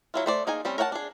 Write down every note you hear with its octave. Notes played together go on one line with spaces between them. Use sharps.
F#3 E4 F4
A3 C5 D5
A#3 D#4 G#4 G#5
G3 C4 C#4
A#4 C#5 F#5 G5 A5
D4 G#4